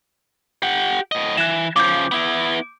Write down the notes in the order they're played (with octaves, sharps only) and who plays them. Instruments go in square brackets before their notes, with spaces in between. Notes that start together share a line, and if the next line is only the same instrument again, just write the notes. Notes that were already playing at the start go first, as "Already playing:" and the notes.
[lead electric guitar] G4 F#5
A2 D#5
[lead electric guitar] E3 [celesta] F#6 E7
[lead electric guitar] C#3 F3 [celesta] D6 G6
[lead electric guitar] B3 E4